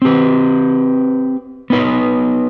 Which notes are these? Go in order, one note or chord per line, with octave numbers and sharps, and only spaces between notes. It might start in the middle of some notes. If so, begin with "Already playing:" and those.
C4 G4 B4
B3 D#4 B4